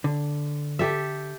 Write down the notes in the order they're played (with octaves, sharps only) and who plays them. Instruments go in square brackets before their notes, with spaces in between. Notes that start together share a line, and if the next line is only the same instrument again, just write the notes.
[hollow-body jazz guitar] D3
[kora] G4 A4 E5